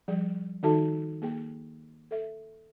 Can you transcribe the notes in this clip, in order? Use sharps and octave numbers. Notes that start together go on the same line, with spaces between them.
F3 G3 G#4 D5
D#3 D#4 F#4 A4 E5 A5
A#3 G#4 G5
A4 E5